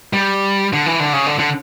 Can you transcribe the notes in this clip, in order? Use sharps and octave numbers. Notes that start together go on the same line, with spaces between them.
G3
D3
E3
D3
C#3
D3
D3